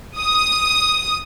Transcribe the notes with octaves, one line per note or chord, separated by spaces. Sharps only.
D#6